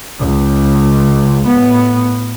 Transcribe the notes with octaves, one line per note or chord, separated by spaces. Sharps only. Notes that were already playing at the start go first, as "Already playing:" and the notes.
C#2
A2 B3